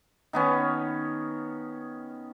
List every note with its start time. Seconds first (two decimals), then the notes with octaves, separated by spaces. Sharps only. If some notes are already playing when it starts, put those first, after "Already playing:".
0.33 D#3 B3 C#4